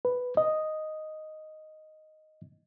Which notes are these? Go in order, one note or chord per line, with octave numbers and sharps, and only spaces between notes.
B4
D#5